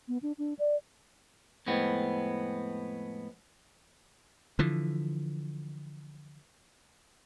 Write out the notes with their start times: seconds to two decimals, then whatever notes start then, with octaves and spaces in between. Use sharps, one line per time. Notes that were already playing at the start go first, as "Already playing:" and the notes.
0.08 B3
0.22 D4
0.38 D4
0.59 D5
1.66 F2 A2 G#3 B3 C4
4.59 D3 E3 F3